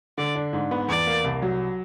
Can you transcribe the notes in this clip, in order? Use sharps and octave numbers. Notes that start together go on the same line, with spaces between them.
D3 D5
D4
G#2
B3
E2 D5
A#3
C2
F#3